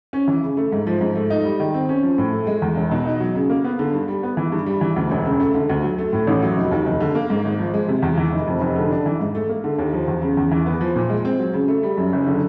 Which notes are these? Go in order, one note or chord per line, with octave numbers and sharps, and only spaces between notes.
C#4
E3
C#3
A3
G#2
F3
G#2
A3
D#4
G3
D#3
C4
C#4
F3
A2
A3
G#3
E2
E1
B2
D#4
F#3
C#3
A#3
B3
D3
G2
G3
B3
E3
G2
G3
E3
D2
E1
C#3
A3
D3
D2
F#3
A3
A2
A1
F#3
F1
D#2
F1
D3
A#3
G#2
G#1
F3
G#3
C3
E2
E3
F1
F2
F1
D3
D4
E3
G#2
A3
A#3
D3
D#2
F3
E2
C#3
E2
E3
B3
F3
A#2
G#3
C4
F#3
C#3
A3
G3
F#2
F#1
D3